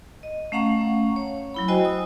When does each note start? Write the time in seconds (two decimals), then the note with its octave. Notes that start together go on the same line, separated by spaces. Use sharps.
0.23 D#5
0.52 A3 C#4 F5 F#5 A#5 C#6
1.16 C#5
1.54 F#3 E4 B5
1.68 F#4 C5 D#5 G5 G#5
1.85 D#6